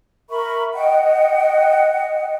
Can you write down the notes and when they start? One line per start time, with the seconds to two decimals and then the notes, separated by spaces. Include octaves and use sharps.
0.30 A#4 E5 B5 C#6
0.75 D#5 F#5 G5